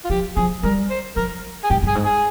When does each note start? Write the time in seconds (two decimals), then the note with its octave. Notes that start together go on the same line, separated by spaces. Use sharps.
0.05 F4
0.10 F3 G4
0.36 F3 G#4
0.63 G3 A#4
0.90 C5
1.16 F3 A#4
1.64 G#4
1.70 G#2 G4
1.83 G2 G#4
1.95 G#2
2.05 G#4